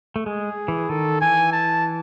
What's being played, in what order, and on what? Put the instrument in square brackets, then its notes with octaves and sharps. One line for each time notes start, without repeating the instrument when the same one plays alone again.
[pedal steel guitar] A3
[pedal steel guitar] G#3 [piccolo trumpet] G#4
[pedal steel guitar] E3
[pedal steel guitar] D#3 [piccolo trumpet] A4
[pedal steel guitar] E3 [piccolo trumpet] G#5
[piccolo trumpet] A5